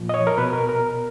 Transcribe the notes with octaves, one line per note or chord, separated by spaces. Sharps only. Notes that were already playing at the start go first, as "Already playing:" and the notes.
Already playing: A#2 F3
D#5
C#5
A#4
B2 B4
A#4
A#4